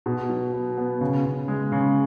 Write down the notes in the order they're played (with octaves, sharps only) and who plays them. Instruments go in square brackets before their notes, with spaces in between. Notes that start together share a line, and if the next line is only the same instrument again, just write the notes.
[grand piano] B2
F#3
B3
B3
C#3
C#3
G#3
C#3